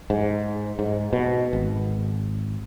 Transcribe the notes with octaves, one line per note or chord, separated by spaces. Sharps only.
G#2
G#2
B2
G#1